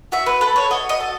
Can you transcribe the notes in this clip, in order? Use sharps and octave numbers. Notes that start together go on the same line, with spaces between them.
F#4 E5
B4
A4 B4
C#5
F#4 D#5
D#5
A4